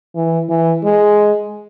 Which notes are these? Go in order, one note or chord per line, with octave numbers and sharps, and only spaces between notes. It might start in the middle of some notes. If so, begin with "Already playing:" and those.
E3
E3
G#3